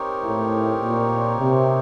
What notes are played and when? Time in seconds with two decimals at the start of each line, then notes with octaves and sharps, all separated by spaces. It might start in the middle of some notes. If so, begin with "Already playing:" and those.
Already playing: C4 D#4 G4 A#4 C#5
0.22 A2
0.82 A#2
1.40 C3